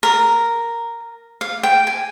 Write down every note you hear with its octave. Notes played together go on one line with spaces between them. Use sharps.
A#4
F5
G5
G#5